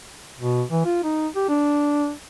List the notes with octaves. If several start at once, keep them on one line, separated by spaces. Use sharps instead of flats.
B2
E3
F4
D#4
G4
D4